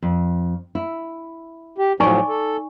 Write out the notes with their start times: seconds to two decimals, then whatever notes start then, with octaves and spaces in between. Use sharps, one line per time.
0.02 F2
0.75 E4
1.78 G4
2.00 A2 F3 F#3 D#4 D5 G#5 C#6
2.29 A4